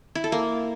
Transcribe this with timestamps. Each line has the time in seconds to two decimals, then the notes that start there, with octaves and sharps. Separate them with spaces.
0.15 E4
0.24 A4
0.32 A#3